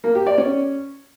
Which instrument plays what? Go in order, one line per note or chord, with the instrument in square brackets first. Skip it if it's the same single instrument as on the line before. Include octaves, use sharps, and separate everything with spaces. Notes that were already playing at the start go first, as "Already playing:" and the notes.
[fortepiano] A#3
G4
D5
C#4